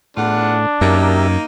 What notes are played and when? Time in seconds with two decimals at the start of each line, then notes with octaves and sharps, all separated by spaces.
0.17 E2 A2 D4 F4 F#5
0.81 F#2 A#3 D#4 G4 A#4 E5